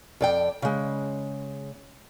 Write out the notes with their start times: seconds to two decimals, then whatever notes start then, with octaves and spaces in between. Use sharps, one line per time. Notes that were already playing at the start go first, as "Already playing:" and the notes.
0.21 F2 D5 G5
0.62 C#3 G#3